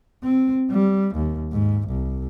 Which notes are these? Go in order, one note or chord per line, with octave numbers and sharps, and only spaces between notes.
C4
G3
D#2
G#2
C2